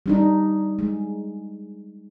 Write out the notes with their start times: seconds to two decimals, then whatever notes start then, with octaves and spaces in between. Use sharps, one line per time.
0.06 G3 D4 D#4
0.79 G#3